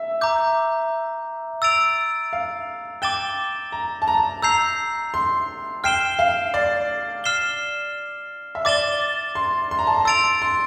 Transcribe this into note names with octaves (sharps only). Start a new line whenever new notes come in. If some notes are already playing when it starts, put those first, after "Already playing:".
Already playing: E5
A#5 D6 G6
E6 A6 D7 F7
F5
G5 D6 A6 E7 G7
A#5
A5
A#5
A#5 E6 G6 C7 F7
C6
G5 F6 C7 E7 G7
F5
D5
F6 C7 E7 G7
E5
D5 D6 A6 E7 G7
C6
C6
A#5
A5
A#5
C6 E6 A6 D7 F7
C6